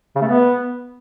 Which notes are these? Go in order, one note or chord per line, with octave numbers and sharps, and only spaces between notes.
C#3
A3
B3